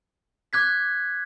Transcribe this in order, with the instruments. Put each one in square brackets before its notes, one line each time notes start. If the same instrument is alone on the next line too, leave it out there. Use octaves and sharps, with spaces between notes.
[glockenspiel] D6 F#6 G#6 B6